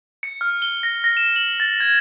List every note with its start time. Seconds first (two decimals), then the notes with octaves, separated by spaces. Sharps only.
0.23 C#7
0.41 F6
0.62 G7
0.83 A#6
1.04 A#6
1.17 E7
1.36 F#7
1.60 A6
1.80 G#6